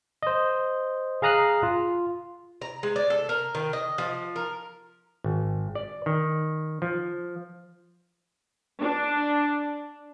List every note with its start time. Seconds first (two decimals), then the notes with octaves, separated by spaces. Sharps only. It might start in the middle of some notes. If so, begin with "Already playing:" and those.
0.23 C5 D#5
1.22 G#4 F5 A#5 D#6 F#6 C7
1.63 F4
2.62 A#5
2.83 G#3
2.96 D5
3.10 A4
3.29 A#4
3.55 D#3
3.73 D#5
3.98 F3
4.36 A#4
5.24 G#1
5.75 D5
6.06 D#3
6.82 F3
8.80 D4